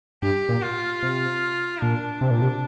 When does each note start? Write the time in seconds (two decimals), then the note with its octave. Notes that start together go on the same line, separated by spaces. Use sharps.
0.23 G2 G4
0.49 A#2
0.63 F4
1.03 C3
1.82 A#2 D4
2.21 C3
2.31 A#2
2.42 C3